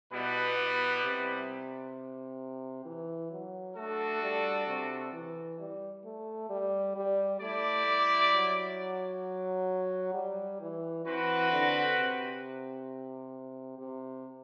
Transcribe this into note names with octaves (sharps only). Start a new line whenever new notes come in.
B2 G3 B3 E4 B4
B2
C3
E3
F#3
A3 D4 F#4 A4
G3
C3
E3
G3
A3
G3
G3
A3 E4 G4 D5
G3
F#3
G3
E3
E3 C4 F#4 B4 F#5
D3
C3
C3